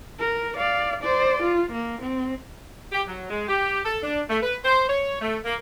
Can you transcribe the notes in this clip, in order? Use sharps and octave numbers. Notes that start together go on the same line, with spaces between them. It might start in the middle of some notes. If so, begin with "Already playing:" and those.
A#4
D5 F5
C5 D5
F4
A#3
C4
G4
F#3
G#3
G4
A4
D4
A3
B4
C5
C#5
A3
A#3